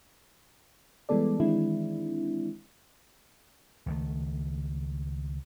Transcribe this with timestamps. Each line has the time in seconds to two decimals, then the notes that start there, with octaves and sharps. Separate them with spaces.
1.09 E3 G3 G#3 B3 A4 D5
1.40 D#3 E3 G#3 C4 D4 E4
3.86 C#2 D#3 A3